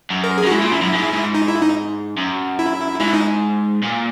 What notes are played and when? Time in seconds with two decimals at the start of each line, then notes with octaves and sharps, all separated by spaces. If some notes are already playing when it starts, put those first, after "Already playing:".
0.10 F#2
0.24 A#4
0.38 G#4
0.44 F#2
0.46 F#4
0.51 G#2 E4
0.62 A#2
0.72 F#2
0.82 F#2
0.93 G#2
1.13 G#2
1.34 D#4
1.48 E4
1.62 D#4
2.17 F#2
2.59 E4
3.00 G#2 E4
3.14 D#4
3.83 A#2